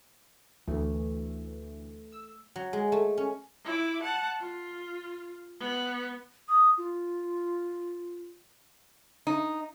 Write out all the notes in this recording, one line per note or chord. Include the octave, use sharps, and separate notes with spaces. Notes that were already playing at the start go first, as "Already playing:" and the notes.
D2 E3 A3
E6
F#3
G#3
A3
C#4
E4 D6
F#5 A5
F4
B3
D#6
F4
D#4